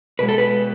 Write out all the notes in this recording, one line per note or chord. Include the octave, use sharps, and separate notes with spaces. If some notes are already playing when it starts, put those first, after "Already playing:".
B2 G#3 B4
A4
B4